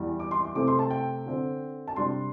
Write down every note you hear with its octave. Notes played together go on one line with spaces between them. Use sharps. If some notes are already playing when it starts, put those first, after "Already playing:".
Already playing: E2 E3 G3
D6
C6
D6
C3 A3 C4 D6
C6
A5
G5
D3 C4
A5
C3 G3 D4 C6